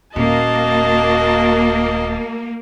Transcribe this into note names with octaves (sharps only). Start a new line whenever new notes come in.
D#1 A#3 F#4 D#5 A5